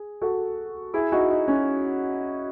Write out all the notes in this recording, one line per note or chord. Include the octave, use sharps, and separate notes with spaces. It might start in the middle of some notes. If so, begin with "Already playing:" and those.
Already playing: G#4
F#4 A4
E4 G#4
D#4 F#4
D#4
C#4